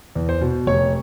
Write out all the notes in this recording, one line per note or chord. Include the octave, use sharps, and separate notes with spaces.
E2
C5
B2
F1 C#5